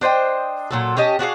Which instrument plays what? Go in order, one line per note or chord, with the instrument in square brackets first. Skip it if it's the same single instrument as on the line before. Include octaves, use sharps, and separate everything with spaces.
[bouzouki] D4 C5 D#5 G5
A#2 F#3 A4
C#4 G4 D#5 A5
D4 F#4 G#4 F5